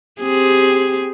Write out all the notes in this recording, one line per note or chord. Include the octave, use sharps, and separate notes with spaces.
C4 G4 G#4